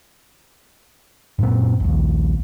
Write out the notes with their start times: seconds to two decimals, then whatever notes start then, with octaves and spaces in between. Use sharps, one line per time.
1.39 F#2 A#2 C4
1.80 A#1 D#2